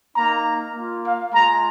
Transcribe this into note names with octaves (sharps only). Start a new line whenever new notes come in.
A#3 D#4 A#5
A#3 F4
F5
G#3 F4 A#5